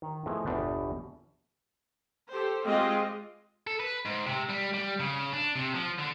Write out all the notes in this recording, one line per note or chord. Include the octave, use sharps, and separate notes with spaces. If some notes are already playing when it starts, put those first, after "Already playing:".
D#3
F3 A3 B3 E4 G#4 D#5
G1 E2 B2 D4 G4
G4 A4 C5
G#3 C4 F4 G4 D#5
A4
B4
G#2
C3
G3
G3
C#3
D4
C3
F3
D3